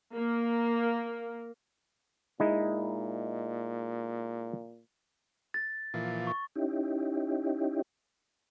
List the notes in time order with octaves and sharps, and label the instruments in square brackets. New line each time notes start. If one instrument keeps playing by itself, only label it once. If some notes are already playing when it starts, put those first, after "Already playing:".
[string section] A#3
[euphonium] A#2 [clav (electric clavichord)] G#3 D#4 E4
[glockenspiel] A6
[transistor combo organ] A#2 E3 F3
[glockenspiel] C#6
[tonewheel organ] C#4 D#4 E4 G4